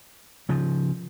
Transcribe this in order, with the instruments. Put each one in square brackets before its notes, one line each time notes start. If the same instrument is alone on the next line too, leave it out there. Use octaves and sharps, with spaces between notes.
[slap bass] C#3 F3